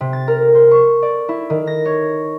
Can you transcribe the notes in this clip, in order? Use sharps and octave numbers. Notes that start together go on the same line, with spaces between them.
C3
A6
A#4
C5
C#6
D5
E4
D#3
A#6
C#5